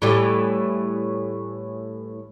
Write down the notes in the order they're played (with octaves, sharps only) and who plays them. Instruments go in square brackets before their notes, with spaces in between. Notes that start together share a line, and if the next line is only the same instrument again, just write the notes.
[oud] A2 E3 G3